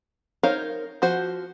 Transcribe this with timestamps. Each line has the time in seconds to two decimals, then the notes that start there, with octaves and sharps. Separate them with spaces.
0.43 D#4 A#4 C5 C#5 F5
1.02 F3 F#4 C5